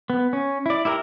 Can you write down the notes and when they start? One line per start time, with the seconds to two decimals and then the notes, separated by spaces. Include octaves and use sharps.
0.10 B3
0.33 C#4
0.66 E4 D5
0.85 E4 G4 A#4 C#5 A#5